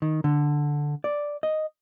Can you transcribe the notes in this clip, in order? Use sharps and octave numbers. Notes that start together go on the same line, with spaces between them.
D#3
D3
D5
D#5